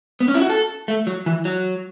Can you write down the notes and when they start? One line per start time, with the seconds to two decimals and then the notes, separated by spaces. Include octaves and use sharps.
0.20 B3
0.28 C#4
0.34 E4
0.41 F#4
0.50 A4
0.88 A3
1.07 F#3
1.26 E3
1.45 F#3